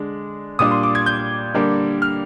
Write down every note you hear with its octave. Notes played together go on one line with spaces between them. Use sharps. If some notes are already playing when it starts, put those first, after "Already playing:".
Already playing: D3 G#3 D4
A#2 G3 D4 D#6
C6
D6
G#6
G6
D3 G3 A#3 D4
F6